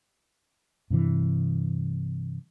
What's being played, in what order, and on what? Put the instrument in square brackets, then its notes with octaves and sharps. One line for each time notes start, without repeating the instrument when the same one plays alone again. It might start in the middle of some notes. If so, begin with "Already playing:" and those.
[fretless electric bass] G2 C3 E3